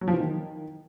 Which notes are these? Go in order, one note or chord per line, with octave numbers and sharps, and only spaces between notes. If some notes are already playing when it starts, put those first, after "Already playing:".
F#3
F3
E3
D#3